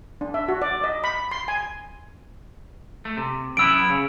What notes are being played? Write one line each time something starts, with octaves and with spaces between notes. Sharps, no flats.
D4
E5
F#4
D5
D#5
B5
C6
G#5
A3
C3
F#2 B3 E4 E6 D7
C#3